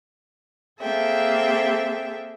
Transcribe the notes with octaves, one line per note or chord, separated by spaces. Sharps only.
A#3 C4 G#4 A4 E5 G5